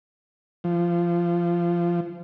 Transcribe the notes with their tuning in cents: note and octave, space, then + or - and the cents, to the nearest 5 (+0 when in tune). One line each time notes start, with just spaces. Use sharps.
F3 -20